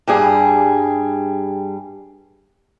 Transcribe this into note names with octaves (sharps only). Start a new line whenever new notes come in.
G2 G3 G#4